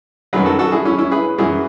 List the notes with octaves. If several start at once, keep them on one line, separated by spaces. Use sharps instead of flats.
F#2 D#3 F#3 G#4 B4
F#4 A4
F#4 A4
E4 G#4
C#4 E4
C#4 E4
G#4 B4
F#2 E3 E4 G#4